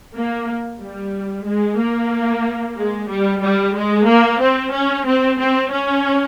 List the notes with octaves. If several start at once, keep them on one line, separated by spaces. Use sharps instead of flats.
A#3
G3
G#3
A#3
G#3
G3
G3
G#3
A#3
C4
C#4
C4
C4
C#4